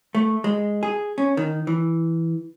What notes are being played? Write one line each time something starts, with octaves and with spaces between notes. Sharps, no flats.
A3
G#3
G#4
C#4
D#3
E3